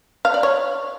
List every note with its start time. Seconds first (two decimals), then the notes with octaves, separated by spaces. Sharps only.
0.25 F5
0.34 D5
0.43 C#5